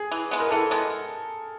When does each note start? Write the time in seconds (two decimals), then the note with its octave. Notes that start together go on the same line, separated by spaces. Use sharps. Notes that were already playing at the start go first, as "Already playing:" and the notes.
Already playing: G#4
0.12 E3
0.31 G#3 B3
0.40 A#4
0.51 E3 A4
0.71 G#3 B3